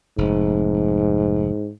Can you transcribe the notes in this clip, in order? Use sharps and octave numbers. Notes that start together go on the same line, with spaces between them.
F1 G#2